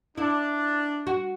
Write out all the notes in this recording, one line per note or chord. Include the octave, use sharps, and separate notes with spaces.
D4 E4
F#4